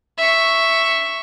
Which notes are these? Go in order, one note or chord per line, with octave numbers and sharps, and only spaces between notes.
E5 C#6